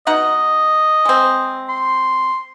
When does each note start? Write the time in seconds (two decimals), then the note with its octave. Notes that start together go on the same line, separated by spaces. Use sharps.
0.07 B2 D#4 D#5 F#5
1.05 G#3 C4
1.69 C6